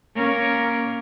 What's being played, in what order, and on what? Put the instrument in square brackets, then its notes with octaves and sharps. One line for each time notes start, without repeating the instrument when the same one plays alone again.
[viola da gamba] A#3 C#4 A#4